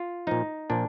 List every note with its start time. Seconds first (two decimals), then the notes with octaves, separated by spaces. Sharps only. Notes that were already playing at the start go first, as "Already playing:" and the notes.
Already playing: F4
0.27 A#2 F3 D#4
0.70 A#2 F3 D4